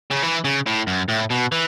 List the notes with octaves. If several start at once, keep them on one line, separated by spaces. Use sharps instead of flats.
C#3
E3
C#3
A2
F#2
A2
B2
E3